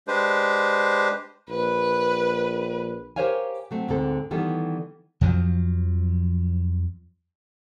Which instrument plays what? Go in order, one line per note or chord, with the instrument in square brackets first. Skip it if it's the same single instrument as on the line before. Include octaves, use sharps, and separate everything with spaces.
[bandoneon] G#3 D4 G4 B4 C5
[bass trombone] A#1 [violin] B4
[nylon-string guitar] G4 A#4 C5 C#5 F5 G#5
F#3 A3 C4
D2 G#2 D3 C4 A4
D#3 E3 G3 B3 A4
[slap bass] F2 F3 F#3